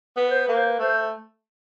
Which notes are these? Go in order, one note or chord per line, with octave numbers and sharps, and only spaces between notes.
B3 B4
C5
B4
A#3
C5
B4
A3 C5